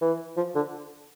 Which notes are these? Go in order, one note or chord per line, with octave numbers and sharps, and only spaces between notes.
E3
F3
D3